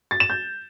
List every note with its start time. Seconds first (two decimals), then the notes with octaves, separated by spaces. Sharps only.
0.11 A6
0.20 E7
0.30 G6